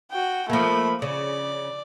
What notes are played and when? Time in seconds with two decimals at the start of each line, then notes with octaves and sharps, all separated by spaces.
0.12 F#4 G5
0.50 F3 A3 A#3 B5
1.02 C#3 D5